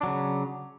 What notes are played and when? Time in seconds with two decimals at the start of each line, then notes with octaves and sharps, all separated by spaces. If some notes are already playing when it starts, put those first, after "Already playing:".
0.01 D4
0.03 F#3
0.06 C#3